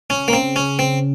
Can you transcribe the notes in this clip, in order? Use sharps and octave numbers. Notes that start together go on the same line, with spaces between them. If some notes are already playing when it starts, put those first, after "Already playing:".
C#3 C#4
A#3
C4
C#4
C4